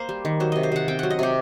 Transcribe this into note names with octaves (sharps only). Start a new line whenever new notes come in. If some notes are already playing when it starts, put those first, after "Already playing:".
Already playing: A#3 A#4 C5
G3
D#3
F#3 C5
C3 D#5
C5
C3 F#5
C4 G5
F#3 F#5
D#5
C3 G4